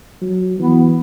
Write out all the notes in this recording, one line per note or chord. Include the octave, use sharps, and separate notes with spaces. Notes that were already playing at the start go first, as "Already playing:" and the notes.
F#3
E3 B3